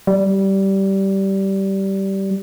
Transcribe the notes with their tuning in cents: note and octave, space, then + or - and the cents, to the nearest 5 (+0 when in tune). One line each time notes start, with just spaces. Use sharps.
G3 -15